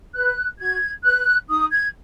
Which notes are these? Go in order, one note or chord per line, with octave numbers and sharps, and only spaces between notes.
B4 F#6
F#4 G#6
B4 F#6
D#4 D#6
G#6